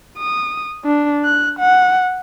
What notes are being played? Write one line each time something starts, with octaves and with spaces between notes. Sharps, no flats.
D#6
D4
F#6
F#5